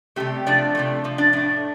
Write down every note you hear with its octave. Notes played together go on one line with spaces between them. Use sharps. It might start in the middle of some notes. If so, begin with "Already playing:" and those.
C3 F3 G3 A3 G4
C3 F3 A3 D4 D5
C3 F3 A3
C3 F3
D4 D5
A2 A3 D4 D5